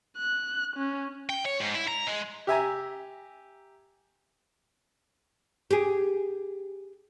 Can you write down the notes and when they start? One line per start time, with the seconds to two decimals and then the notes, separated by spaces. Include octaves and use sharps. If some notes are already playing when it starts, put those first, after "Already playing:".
0.17 F#6
0.76 C#4
1.29 G5
1.45 C#5
1.60 G#2
1.75 E4
1.88 A#5
2.07 G#3
2.47 G4 E5 G#5 A#5
5.71 G4 G#4